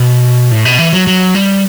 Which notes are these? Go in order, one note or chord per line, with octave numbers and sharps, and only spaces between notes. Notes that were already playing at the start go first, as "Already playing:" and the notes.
Already playing: B2
A2
B2
E3
F#3
F#3
G3